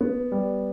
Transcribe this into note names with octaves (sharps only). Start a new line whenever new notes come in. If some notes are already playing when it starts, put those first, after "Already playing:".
B3
G3